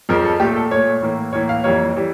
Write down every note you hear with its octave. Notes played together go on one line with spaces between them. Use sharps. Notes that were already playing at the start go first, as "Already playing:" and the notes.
F2 C#3 F3 A#4
A4
A#2 A3 G4
A4
A#2 A3 C#5
A2 E3 A#3
A2 E3 A#3 C#5
F5
F2 E3 G3 A#3 C#5
E3 G3